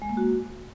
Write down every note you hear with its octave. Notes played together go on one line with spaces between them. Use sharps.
G#3
A#3
F#4